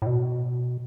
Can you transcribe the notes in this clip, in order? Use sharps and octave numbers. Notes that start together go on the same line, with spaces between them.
A2
B2